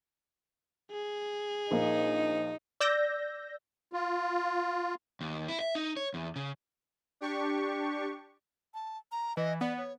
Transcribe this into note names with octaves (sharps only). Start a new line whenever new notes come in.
G#4
A#1 A#3 D#4
D5 E6 G6 A#6
F4
D#2
E4
E5
D#4
C#5
E2
C#3
D4 G4 C#6
A5
A#5
E3 D#5
B3 D5
C#5